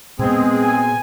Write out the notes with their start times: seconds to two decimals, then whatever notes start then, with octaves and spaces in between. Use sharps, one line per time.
0.19 A#2 G#3 B3 C4 G#4
0.63 G#5